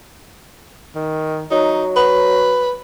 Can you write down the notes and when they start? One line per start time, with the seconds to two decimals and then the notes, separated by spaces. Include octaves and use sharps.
0.95 D#3
1.51 F#3 D#4
1.96 B4